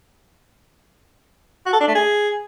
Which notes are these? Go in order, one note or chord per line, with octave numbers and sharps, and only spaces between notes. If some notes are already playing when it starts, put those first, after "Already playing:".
F#4
A4
D4
A3
G#4